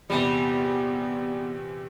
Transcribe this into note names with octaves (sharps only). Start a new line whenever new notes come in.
A#1 E2 C3 G3 B3